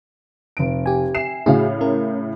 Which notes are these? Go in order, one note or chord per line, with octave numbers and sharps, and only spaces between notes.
F1 D7
G4 G#5
E5 C7 E7
A2 C#3 F#4 G#4 F5
C#4 A#4